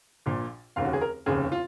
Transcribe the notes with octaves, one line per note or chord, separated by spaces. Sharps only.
A#1 A#2
F1 D#2 C#3 F5
F#4
G#4
A#4
F1 D#2 C#3 G#4
F4